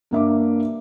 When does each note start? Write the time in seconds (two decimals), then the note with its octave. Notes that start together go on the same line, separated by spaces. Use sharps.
0.11 G2 A#3 E5 D6